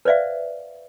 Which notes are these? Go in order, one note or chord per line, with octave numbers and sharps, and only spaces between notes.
B4 C5 D5 E5 F5